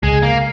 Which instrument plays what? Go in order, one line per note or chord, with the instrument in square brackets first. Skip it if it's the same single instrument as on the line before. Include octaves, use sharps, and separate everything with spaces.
[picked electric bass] C#2 [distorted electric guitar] G#3
[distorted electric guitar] A#3